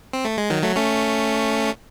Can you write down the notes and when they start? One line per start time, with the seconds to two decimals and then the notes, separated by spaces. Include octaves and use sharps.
0.13 C4
0.25 A3
0.38 G#3
0.50 D#3 F#3
0.63 F#3 A3
0.76 A3 C#4